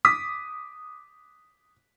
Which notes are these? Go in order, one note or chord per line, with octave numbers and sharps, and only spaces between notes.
D6 D#6 B6